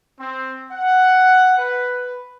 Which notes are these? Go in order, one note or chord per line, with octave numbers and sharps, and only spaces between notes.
C4
F#5
B4